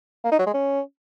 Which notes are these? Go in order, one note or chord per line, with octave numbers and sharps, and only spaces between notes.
A#3
D#4
F#3
G#3
C#4